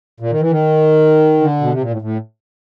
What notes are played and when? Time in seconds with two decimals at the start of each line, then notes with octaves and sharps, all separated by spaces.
0.20 A#2
0.30 D#3
0.41 E3
0.51 D#3
1.41 D3
1.61 B2
1.72 C3
1.81 A#2
1.90 A2
2.02 A2